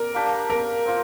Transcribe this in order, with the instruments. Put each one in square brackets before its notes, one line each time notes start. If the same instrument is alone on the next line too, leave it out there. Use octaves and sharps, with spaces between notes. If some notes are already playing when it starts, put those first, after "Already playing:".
Already playing: [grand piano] A#4 [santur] D5
[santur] A#3 D4 G4
[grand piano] A#4
[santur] C4 F4